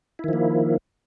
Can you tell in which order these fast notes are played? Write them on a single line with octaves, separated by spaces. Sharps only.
E4 D#3 F3 A#3